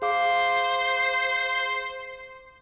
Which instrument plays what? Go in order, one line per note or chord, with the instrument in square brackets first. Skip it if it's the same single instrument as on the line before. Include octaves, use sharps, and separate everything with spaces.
[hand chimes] G#4 F5 D6 [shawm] C5